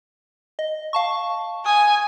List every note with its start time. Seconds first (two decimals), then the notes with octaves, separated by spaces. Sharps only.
0.59 D#5
0.93 F5 A5 C#6
1.66 G#5 D#6